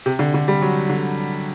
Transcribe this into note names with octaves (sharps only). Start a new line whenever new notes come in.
C3
D3
D3
G3
F#3
D3